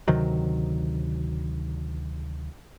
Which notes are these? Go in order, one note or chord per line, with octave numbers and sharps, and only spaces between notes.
D2 C3 D#3 F#3